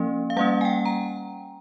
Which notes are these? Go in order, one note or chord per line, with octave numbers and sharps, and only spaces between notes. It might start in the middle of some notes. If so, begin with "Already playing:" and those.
Already playing: F3 A#3 C#4
F5
G3 A#3 C#4 F#5
G#5
G5
A#5